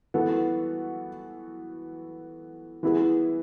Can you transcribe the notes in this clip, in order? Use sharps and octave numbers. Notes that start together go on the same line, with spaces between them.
E3 B3 F#4 A4
E3 B3 E4 G#4